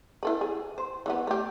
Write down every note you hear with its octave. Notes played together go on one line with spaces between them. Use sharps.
E4 A4 B4
G#4
C5
E3 F3 B3
A3 G4